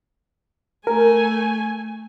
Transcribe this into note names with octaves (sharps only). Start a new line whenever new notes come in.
A3 A#4 G#5